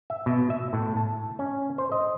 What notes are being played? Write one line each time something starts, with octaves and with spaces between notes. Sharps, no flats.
E5
B2
E5
A2
A5
C#4
C5
D#5